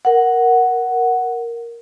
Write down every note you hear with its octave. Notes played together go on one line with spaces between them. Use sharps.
A#4 F#5